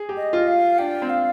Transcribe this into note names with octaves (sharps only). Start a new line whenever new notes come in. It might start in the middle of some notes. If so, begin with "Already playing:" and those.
Already playing: G#4
G4
D#5
F4
F5
D4 G5
C4
F5